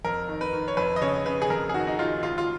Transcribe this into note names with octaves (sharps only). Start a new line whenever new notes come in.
F2 A#4
D#3
B4
D#3
C#5
F2 B4
D#5
C#3 C#5
C#3 B4
G#4
F2 A#4
G#4
D#3 F#4
D#4
D#3 F4
C#2 F4
F4